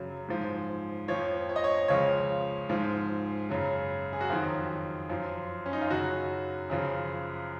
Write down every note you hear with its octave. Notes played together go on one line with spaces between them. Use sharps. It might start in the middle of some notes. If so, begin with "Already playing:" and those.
Already playing: F#2 C#3 F#3
G#2 F3
F2 F3 C#5
C#5
D#5
C#5
C#2 C#3 F3 C#5
G#2 F3
F#2 C#3 F#3
G#4
F#4
F2 D#3 F#3 F4
F#2 F3
C#4
D#4
F4
F#2 C#3 F#3 F#4
F#2 C#3 F3